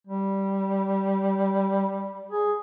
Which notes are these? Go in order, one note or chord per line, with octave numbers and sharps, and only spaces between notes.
G3
G#4